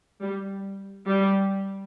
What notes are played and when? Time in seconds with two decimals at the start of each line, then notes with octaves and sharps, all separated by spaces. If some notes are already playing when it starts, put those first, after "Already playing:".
0.22 G3
1.08 G3